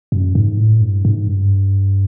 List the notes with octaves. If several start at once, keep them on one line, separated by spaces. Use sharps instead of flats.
F#2
G#2
A2
G2
G#2
G2